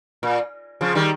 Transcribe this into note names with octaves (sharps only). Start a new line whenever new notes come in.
A#2
C#3 F3
D#3 G3